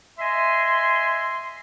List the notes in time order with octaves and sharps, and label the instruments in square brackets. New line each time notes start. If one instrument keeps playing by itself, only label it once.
[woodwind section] D#5 E5 G#5 C6